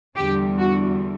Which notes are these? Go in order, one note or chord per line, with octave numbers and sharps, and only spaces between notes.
E2 D3 G3 G4
F#4